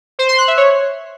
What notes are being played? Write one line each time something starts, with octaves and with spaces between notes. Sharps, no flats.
C5
C6
F#6
E5
C#5